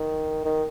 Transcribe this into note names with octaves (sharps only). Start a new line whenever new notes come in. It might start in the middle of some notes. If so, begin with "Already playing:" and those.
Already playing: D#3
D#3